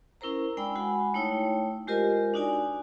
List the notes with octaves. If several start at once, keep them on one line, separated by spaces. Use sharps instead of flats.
C#4 E4 A#4 C5 A#5
G#3 D4 D5 G5 B5 E6
G#3 F#4 F#5 G#5 B5
A3 D#4 E4 C#5 G5
G#3 F4 G4 A#4 C5 D#5
D4 D#4 F#4 D5 G#5